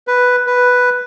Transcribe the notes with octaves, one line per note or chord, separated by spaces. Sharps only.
B4
B4